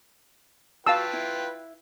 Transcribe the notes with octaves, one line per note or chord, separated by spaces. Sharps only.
F4 F#4 B4 F5 G5 A5 E6
E4